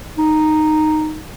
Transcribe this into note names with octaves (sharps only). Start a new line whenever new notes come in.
D#4